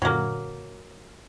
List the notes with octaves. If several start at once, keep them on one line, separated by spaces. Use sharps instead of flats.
F#2 A#2 D3 F#3 A#3